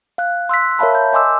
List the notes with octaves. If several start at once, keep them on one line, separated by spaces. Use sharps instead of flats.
F5 F#6
C6 E6 F#6 B6
A#4 C#5 E5 F5 A5 B5
G6
D#5 G#5 C6 D6 E6